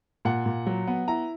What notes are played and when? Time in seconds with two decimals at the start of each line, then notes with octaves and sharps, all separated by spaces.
0.25 A#2 F#5
0.46 A#2
0.66 F#3
0.87 B3
1.08 E4 A#5